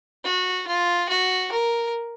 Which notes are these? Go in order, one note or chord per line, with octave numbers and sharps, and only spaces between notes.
F#4
F4
F#4
A#4